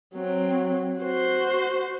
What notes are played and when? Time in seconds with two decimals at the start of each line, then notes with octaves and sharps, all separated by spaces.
0.15 F#3 C4
1.01 F#4 C5